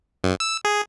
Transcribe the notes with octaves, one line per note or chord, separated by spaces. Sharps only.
F#2
E6
G#4